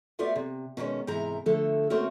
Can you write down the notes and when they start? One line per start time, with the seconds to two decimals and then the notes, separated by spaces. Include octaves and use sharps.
0.19 A3 B3 F4 F#4 D5 E5
0.36 C3
0.77 B2 D#3 G3 G#3 C#4
1.07 G#2 C3 E3 A#4 A#5
1.46 D3 F3 A3 A4
1.90 A3 A#3 C4 C#4 F#4 A#4